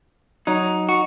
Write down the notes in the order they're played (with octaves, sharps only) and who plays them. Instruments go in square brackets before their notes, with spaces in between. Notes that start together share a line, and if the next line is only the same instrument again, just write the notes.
[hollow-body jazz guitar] F#3 [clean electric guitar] D#4
[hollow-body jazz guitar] F#4